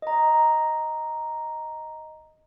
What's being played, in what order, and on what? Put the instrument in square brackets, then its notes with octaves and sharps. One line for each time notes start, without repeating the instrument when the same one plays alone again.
[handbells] D#5 A#5